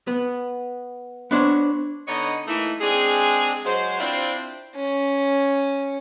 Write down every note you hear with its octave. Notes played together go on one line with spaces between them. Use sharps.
B3
B3 D4 C5 C#5
D3 B3 D#4 C#5 D#5
E3 A3 A#3 D#4 E4
G#3 C4 D4 G#4
F#3 G#3 C5
C4 D4 E4 F4 C5 D5
C#4